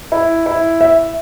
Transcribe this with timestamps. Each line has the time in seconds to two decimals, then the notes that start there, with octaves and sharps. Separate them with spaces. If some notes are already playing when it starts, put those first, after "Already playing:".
0.12 E4
0.46 E4
0.81 E5